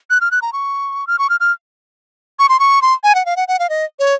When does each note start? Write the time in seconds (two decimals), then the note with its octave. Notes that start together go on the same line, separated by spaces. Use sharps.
0.10 F#6
0.21 F6
0.31 F#6
0.42 A#5
0.53 C#6
1.07 F6
1.19 C#6
1.30 F6
1.40 F6
2.39 C#6
2.49 C6
2.60 C#6
2.82 C6
3.03 G#5
3.15 F#5
3.25 F5
3.36 F#5
3.48 F#5
3.59 F5
3.69 D#5
3.99 C#5